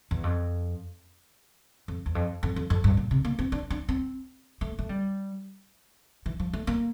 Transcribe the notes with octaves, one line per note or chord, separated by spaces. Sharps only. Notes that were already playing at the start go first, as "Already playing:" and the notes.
E2
F2
F2
E2
F2
F2
F2
F2
G2
A#2
C3
A#3
C4
D4
D4
C4
A3
A3
G3
E3
F3
A3
A#3